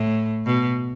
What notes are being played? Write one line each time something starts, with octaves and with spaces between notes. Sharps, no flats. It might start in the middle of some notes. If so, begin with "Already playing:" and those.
Already playing: A2
B2